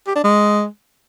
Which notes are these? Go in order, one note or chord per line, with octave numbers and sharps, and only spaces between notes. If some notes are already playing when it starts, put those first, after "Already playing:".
G4
D4
G#3